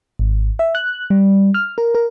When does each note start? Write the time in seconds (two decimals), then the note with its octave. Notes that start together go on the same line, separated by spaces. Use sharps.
0.19 G#1
0.59 E5
0.75 F#6
1.10 G3
1.54 F6
1.78 A#4
1.95 A#4